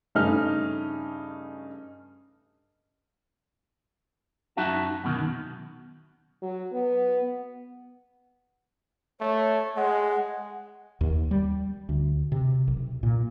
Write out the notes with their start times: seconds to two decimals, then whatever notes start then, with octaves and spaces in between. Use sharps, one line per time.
0.15 G2 C#3 A3 C#4 D#4 F6
4.57 F#2 D#4 E4 F#4 E5 A5
5.04 F#2 B2 D3 D#3
6.42 F#3
6.72 B3
9.21 A3 C#5
9.76 G#3 F#5
11.01 D#2
11.31 G3
11.89 D2
12.32 C3
12.68 B1
13.03 A#2